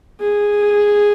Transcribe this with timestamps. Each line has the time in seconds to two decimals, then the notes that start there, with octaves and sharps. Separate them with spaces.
0.20 G#4